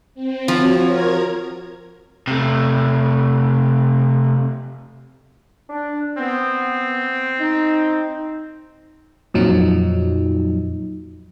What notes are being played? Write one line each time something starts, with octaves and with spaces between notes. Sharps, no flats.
C4
F3 F#4 C#5
A#4 A#5 G#6
C3 A3
D4
B3 C4
D#4
F2 A#2 F3 F#3 D#4